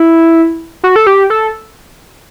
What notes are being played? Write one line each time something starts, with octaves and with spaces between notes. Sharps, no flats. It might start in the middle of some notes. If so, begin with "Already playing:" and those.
Already playing: E4
F#4
A4
G4
A4